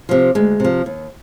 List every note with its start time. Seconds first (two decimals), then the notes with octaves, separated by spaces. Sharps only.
0.09 C3 F3
0.35 D2 G#3
0.60 C3 F3
0.86 D#2